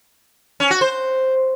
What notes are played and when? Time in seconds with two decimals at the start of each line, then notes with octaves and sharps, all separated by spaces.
0.60 C#4
0.71 F#4
0.81 C5